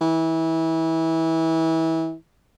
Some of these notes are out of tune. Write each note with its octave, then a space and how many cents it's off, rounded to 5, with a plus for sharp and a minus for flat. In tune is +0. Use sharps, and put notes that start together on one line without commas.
E3 -25